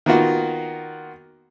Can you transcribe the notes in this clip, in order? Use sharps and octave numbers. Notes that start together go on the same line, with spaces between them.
D#3 A#3 B3 F4 F#4